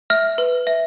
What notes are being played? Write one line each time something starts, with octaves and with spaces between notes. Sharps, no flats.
E5 F6
B4
E5